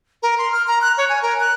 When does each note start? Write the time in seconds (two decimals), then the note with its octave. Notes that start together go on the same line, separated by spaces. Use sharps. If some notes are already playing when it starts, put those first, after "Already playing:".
0.22 A#4
0.38 C6
0.52 F6
0.67 A#5
0.81 F#6
0.98 C#5
1.09 G#5
1.22 A#4
1.40 F#6